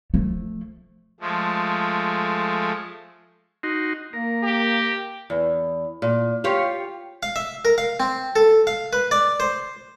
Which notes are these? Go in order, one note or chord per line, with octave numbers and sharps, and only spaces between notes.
F3 A3
F3 G#3 A3
D#4 F#4 C6
A#3 A#4
G4
E2
A#2
F4 G4 C#5
F5
E5
A#4
F5
C4
A4
F5
B4
D5
C5